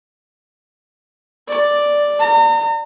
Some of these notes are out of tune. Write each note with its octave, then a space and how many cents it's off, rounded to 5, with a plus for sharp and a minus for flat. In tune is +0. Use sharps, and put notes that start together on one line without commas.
D5 +0
A#5 -40